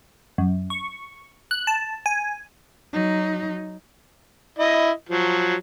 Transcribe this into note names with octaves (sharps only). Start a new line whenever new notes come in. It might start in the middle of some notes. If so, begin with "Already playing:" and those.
F#2
C#6
F#6
A5
G#5
F#3 D#4
E4 D#5
F3 F#3